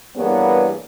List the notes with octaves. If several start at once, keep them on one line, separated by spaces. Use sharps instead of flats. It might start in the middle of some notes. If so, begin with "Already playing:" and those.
G2 E3 A#3 B3 G#4 C#5